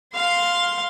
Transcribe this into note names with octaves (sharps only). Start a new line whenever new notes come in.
F5 C6